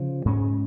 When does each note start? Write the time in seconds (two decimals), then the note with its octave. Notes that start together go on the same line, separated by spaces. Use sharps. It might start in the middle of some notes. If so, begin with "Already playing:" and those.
Already playing: C#3 F3
0.25 G#2 G#3 C#4